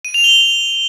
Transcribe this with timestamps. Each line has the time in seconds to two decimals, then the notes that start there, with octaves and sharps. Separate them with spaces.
0.05 D#7
0.14 F7
0.24 G7